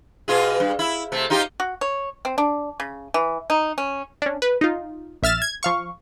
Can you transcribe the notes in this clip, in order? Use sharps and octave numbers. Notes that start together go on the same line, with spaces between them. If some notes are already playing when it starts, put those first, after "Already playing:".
B2 F4 G#4
G2
E4
C3 A3
D#4 F4 G4
F#4
C#5
C4
D4
C#3
E3
D#4
C#4
C#4 D4
B4
D#4 F4
A#1 E5 F6 A6 E7
G#6
F3 F5 C#6